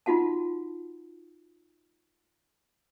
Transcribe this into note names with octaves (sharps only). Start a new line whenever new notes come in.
D#4 F4 F#4 F#5 A5